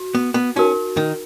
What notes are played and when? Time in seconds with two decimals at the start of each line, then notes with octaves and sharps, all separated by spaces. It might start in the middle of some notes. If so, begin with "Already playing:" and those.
Already playing: F#4
0.15 B3
0.34 B3
0.56 C#4 D#4 F#4 A#4
0.97 D#3